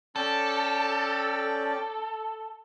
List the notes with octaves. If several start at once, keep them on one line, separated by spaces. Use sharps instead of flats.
C#4 A4 D5 G5